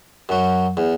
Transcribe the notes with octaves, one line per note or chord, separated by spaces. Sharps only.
F#2 F#3
E2